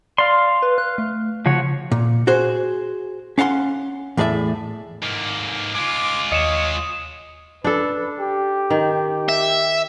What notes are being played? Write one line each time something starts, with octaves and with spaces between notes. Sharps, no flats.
D5 F5 C6
B4
F#6
A3
C#3 F3 F#4 C#5
A#2
F#4 G#4 C5
C#4 F5 F#5 A5 C6
E2 A2 G#4 D5 E5
G#2 A#3
G#3 F4 D6
D#2 C#5 D#5 D#6 C#7 E7
D4 A4 B4
G4
D#3
E5